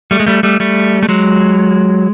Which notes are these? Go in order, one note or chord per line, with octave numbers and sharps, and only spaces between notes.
G3 A3
G#3
G3 A3
G3 A3
G3 A3
A3
F#3 G#3